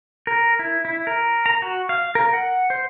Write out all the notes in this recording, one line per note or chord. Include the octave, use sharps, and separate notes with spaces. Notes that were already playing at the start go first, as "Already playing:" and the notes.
A#4
E4
E4
A#4
A#5
F#4
F5
A#4
F#5
C5